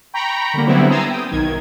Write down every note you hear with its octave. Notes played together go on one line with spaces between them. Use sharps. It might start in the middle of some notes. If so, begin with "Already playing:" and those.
G5 A#5 B5 C#6
D3 G3 A#3
D3 F#3 G3 B3 C4 E4
G#5 A#5 C6 D#6 E6 A6
G5 D#6
B1 D#3 G#6